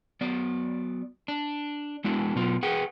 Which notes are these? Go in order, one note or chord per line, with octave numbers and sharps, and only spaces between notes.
F#3 B3 D5
D4
G#3 B3 D4 E4 F#4
B2 F#3 B3 F4
G#4 B4 F#5 G5